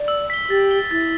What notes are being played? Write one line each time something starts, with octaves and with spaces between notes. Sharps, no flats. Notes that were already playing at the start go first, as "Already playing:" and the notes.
Already playing: D5
E6
B6 G7
G4 A6
G7
E4 A6